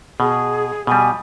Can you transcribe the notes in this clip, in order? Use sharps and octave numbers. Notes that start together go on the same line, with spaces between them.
B2 G#4
B2 G3 G#5